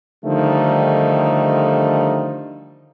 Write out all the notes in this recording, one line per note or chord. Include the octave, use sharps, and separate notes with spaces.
D3 D#3 F3 G3 A3 D#4